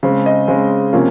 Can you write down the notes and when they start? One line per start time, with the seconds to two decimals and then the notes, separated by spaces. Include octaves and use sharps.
0.03 C#3 G#3 C4
0.26 D#5
0.48 C#3 G#3 C4
0.93 C3 F3 A#3 C#4